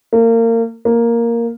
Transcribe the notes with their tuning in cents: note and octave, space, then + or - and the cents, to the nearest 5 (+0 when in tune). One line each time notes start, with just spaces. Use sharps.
A#3 -30
A#3 +0